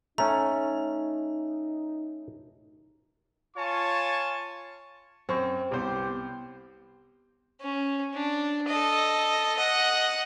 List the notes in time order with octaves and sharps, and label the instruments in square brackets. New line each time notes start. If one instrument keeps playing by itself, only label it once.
[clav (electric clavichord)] A3 C#4 [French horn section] D#4 [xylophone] A#5
[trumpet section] F4 C#5 G#5 A5 C#6
[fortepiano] F#2 C#6 [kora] C4
[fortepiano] C2 C5 [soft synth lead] B3 [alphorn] G4
[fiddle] C#4
D4
A4 D#5
D#5 F#5